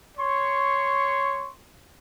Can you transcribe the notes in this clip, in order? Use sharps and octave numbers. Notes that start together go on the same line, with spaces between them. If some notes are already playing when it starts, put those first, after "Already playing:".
C#5 C6 C#6